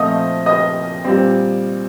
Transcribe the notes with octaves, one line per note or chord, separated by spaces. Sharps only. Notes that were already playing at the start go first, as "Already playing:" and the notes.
Already playing: A#2 F3 A3 C4 D#5 D#6
D#5 D#6
A#2 G3 C4